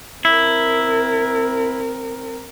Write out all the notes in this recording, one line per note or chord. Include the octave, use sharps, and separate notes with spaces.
C4 E4 A#4